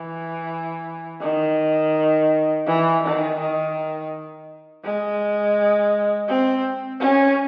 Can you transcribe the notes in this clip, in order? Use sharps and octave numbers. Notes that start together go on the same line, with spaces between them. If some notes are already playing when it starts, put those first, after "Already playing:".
Already playing: E3
D#3
E3
D#3
D#3
G#3
C4
C#4